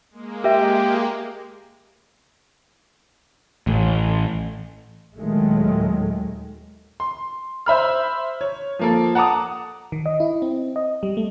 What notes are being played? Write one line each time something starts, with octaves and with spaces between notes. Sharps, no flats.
G#3 A#3
G4 A#4 E5
A1
D#2 A#2 D#3 F#3 G#3 A3
C6
C5 E5 B5 F6
C#5
F3 A#3 A4
F#5 A5 A#5 D6 D#6
D#3
D#5
E4
C4
D#5
G3
A3